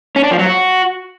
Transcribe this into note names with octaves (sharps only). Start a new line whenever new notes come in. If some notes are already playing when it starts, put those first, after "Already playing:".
C#4
D4
F3
F#3
F#4